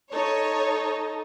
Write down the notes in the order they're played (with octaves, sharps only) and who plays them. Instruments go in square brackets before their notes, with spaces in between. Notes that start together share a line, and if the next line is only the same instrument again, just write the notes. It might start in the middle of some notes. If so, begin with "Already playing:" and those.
[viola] D#4 A4 [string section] C#5